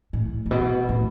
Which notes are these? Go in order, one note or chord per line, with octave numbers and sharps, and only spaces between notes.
A2
A2
B2
A2